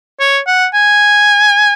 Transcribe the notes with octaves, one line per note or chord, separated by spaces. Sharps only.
C#5
F#5
G#5